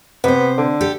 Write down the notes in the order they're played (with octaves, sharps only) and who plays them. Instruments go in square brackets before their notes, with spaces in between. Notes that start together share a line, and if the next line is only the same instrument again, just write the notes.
[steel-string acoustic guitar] C3 C5 [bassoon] B3
[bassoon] D3
[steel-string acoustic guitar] G4 A4